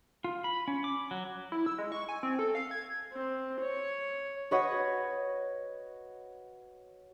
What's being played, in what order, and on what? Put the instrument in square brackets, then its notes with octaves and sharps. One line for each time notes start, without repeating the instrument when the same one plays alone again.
[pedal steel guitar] F4
B5
C#4
D6
F#3
[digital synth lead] E4
E6
G#3
C#6
G#5
C4
A4
F5
G#6
[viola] C4
C#5
[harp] F#4 B4 C#5 D#5 F#5